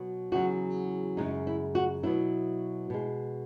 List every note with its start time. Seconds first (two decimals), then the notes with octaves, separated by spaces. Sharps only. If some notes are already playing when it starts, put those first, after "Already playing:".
Already playing: B2 F#3
0.32 E2 C#3 F#3 F#4
1.17 F#2 C#3 G#3 D#4
1.47 E4
1.75 F#4
2.03 B2 F#3 E4
2.90 B2 G#3